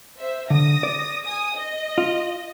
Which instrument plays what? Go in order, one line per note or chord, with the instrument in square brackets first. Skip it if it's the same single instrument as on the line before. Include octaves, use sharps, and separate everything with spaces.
[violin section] C5 E5
[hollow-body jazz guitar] D3 [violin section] D#6 A#6
[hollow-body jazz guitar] D5
[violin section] G#5 D#6
D#5
[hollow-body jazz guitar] F4